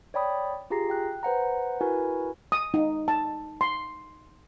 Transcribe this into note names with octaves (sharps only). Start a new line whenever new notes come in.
C#5 D5 G5 B5 D#6
F4 G4 G#4 A#5 A#6 C7
G5 F#6
B4 C5 F#5 A#5
E4 F#4 A#4 B4 G#5
D#6
D#4
A5
C6